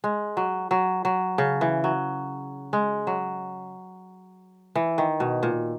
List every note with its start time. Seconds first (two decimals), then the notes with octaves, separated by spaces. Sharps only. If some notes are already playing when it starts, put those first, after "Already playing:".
0.04 G#3
0.37 F#3
0.71 F#3
1.05 F#3
1.38 C#3
1.61 E3
1.84 F#3
2.73 G#3
3.07 F#3
4.75 E3
4.98 D#3
5.20 B2
5.43 A#2